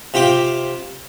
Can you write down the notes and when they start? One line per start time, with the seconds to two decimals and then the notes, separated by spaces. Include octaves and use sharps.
0.14 C3 F4 G4 D6